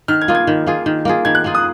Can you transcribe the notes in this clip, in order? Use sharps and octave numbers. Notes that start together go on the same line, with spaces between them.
D#3 F6
G#6
A#3 F4 G#4
G#6
D#3
A#3 F4 G#4
D#3
A#3 F4 G#4
D#3 G#6
F#6
A#3 F4 G#4
D#6